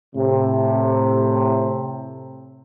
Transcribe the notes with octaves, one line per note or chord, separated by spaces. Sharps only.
A2 C3